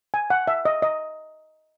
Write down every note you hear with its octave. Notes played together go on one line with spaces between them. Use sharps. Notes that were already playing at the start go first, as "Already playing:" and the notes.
G#5
F#5
E5
D#5
D#5